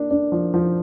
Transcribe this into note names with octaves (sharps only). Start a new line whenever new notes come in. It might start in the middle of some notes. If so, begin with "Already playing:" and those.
Already playing: A#3 D4
D4
F3
F3